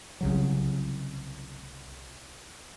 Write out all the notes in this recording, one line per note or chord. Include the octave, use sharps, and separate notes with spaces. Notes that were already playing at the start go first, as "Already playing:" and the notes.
C2 C#3 F#3